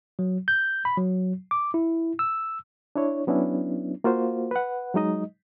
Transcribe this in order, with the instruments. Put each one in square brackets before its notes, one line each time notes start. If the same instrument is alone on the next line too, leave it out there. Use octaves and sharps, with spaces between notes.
[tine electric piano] F#3
G6
B5
F#3
D6
E4
E6
[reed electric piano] D4 E4 C#5
F#3 B3 C#4 D4 E4
A#3 F4 F#4 C5
B4 F#5
F#3 G#3 D#4 D#5